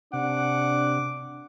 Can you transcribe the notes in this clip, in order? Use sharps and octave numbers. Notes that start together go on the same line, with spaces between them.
C3 D4 F#5 D6